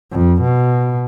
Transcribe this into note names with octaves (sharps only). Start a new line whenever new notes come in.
F2
B2